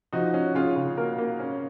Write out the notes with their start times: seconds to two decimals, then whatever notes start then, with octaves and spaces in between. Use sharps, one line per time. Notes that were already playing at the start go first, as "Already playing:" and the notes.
0.13 F3 D#4 F#4
0.34 C#4
0.55 C#4 F4 G#4
0.76 C#3
0.97 A#3 F#4 A#4
1.18 A#3
1.40 C#4